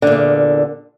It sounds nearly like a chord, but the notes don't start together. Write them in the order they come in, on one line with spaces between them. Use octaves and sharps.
D3 A#2 E2